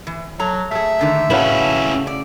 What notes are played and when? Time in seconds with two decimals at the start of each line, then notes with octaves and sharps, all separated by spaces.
0.07 E3
0.39 F#3 A4 A#5
0.71 A3 G#4 E5
0.99 G#2 D3 D#3
1.30 A2 C#3 C#4 E4 F#4 B4
2.07 D5